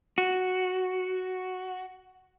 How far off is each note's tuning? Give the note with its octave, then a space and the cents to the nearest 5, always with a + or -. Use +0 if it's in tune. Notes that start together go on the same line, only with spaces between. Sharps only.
F#4 +0